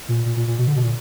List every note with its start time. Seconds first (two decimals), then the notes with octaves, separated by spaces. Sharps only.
0.09 A#2
0.25 A#2
0.37 A#2
0.47 A#2
0.59 B2
0.67 D3
0.76 B2
0.84 A#2